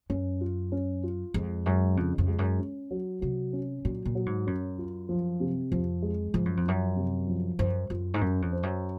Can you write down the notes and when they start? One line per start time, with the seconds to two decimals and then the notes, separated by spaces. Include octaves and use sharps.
0.10 F#2 C#4
0.41 F4
0.72 C#4
1.03 F4
1.34 F2 G#3
1.66 F#2 G#3
1.97 F2 C#3
2.18 F2
2.28 G#3
2.39 F#2
2.59 C#4
2.91 F#3
3.21 C3 F#3
3.53 C#4
3.85 A#2 F#3
4.05 A#2
4.15 F#3
4.26 G#2
4.47 F#2 C#4
4.78 F4
5.09 F3
5.40 C3
5.72 F2 F3
6.02 G#3
6.34 G#2 F3
6.45 F#2
6.57 F2
6.65 F#2 F3
6.96 C3
7.28 F3
7.59 F#2 C5
7.90 F#2 F4
8.14 G#2
8.21 F#2 C#4
8.42 F2
8.52 C5
8.63 F#2